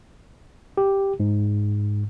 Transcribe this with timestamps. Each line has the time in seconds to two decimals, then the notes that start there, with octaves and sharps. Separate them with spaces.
0.77 G4
1.20 G#2